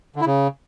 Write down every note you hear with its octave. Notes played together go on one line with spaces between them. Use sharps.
D3
E4
C#3